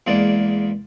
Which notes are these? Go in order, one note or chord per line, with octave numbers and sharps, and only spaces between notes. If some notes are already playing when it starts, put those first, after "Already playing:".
E2 G#3 A#3 D5